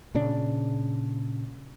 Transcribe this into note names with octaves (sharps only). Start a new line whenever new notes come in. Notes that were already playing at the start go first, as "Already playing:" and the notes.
A#2 C#3 D4